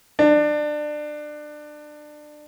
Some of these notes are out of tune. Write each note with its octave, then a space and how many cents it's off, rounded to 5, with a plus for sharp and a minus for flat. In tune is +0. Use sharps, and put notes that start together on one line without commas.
D4 +25